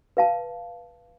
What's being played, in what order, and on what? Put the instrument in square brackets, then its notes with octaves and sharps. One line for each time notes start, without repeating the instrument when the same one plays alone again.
[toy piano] B4 F5 A5